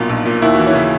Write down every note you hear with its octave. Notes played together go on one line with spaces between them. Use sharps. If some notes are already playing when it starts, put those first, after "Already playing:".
Already playing: B1 A#2 B3 D#4
A#1
A#2
D#2 E4
E3 F#4
C#4 E4
C#3